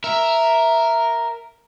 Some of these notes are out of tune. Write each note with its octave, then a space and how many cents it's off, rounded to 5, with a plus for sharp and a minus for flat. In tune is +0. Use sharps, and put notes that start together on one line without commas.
A#4 +0 E5 +0